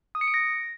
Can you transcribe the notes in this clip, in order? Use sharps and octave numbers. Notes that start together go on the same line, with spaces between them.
D#6
C#7
D7
A#6